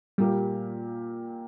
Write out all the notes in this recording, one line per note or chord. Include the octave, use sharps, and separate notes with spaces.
A#2 G3 A#3 G4